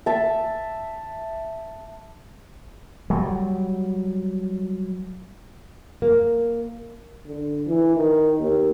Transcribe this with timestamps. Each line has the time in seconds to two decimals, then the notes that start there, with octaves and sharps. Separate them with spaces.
0.06 E5 A5
3.10 F#3 G3
6.02 A#3
7.26 D3
7.67 E3
7.96 D#3
8.40 D#2